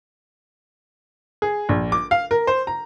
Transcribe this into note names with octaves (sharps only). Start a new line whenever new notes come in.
G#4
A#1
D6
F5
A#4
C5
A#5